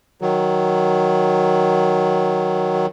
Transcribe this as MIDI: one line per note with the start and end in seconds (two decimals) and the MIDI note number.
0.22 2.86 51
0.22 2.86 54